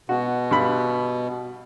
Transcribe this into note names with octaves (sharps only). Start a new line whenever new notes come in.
B2 F#4
G2 B5